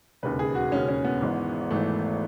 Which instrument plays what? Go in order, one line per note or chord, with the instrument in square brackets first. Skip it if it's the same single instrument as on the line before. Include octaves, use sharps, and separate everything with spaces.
[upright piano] E1 D#2 C#3 B4
G#4
F#4
E1 D#2 C#3 C#4
C#4
B3
G#1 G#2 E3
G#1 G#2 E3 A3